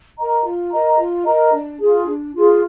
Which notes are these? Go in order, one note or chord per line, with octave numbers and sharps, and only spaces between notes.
A#4 D#5 A#5
F4
A#4 D#5 A#5
F4
A#4 D#5 A#5
D4
F4 G#4
D4
F4 G#4